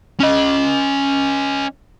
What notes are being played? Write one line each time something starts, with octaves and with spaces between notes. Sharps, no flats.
C#4 D#5